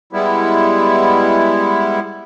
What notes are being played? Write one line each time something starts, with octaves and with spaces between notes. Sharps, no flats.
G3 G#3 B3 E4